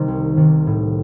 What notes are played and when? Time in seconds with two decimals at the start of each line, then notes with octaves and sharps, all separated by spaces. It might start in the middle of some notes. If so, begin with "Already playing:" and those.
Already playing: C3 D#3 G3 C4
0.08 C2
0.37 C3 D#3 G3
0.67 A2